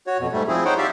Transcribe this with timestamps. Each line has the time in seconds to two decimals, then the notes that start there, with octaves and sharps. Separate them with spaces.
0.07 F#4 C#5
0.20 F2 B2
0.32 G#2 G3 A3
0.48 F3 C4 E4 G#4
0.65 D#4 C5 C#5 F#5 G5
0.78 G4 D5 E5 F5